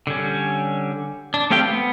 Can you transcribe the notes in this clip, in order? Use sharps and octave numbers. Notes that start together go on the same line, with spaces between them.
D3 G3 C#4
D4
A3 C4 G4 F5 G5
B3